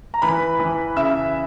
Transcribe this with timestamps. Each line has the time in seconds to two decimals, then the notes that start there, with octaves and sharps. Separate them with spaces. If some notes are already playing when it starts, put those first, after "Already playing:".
0.14 A#5
0.22 E3 B4 B5
0.60 E3
0.97 C#3 E5 E6